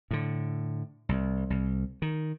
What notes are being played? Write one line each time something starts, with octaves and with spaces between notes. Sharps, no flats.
A2 D3
C2
C2
D#3